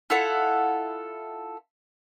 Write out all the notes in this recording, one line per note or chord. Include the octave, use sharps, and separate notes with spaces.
E4 F4 A4 F#5